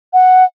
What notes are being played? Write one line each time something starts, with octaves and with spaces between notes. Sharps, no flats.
F#5